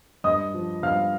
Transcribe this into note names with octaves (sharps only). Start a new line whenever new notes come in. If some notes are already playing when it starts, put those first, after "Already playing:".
G2 D#5 D#6
F3
G2 F5 F6